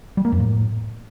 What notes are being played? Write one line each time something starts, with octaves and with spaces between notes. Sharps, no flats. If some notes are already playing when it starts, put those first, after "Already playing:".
G3
A#3
F2
A2